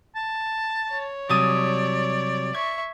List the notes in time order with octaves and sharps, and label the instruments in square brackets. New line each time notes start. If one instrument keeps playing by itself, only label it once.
[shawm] A5
[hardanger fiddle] C#5
[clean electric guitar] C3 F#3 G3 [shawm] D5 [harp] A5 D#6
[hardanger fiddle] E5 C#6 [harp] G#6